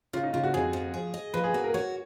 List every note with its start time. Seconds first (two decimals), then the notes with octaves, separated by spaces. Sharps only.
0.13 C#3 F4
0.23 D#4
0.33 C#3 F4
0.44 F#4
0.54 F2 G#4
0.73 F3
0.94 G#4
1.14 D#5
1.34 F3 B4
1.44 G#4
1.54 A#3 F#4
1.64 A#4
1.74 F#4 C#5